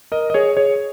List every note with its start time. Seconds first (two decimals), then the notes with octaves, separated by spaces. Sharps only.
0.12 A#4 D#5
0.30 D#5
0.34 G#4 C#5
0.57 G#4 C#5